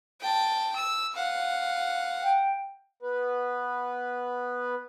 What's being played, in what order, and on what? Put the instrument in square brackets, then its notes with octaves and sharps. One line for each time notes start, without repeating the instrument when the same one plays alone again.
[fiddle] G5 A5
E6
F5 F#5
[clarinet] G5
[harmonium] B3 B4